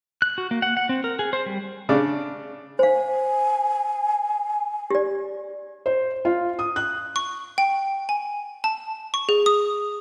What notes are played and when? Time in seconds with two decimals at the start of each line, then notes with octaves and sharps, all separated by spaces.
0.22 F#6
0.38 F#4
0.51 A#3
0.62 F#5
0.77 F#5
0.89 C4
1.04 A#4
1.19 G#4
1.33 C5
1.46 G3
1.89 C#3 D4
2.79 C5 F5 G#5
4.90 G4 D5
5.86 C5
6.25 F4
6.59 D#6
6.76 F#6
7.16 C#6
7.58 G5
8.09 G#5
8.64 A5
9.14 C#6
9.29 G#4
9.46 D#6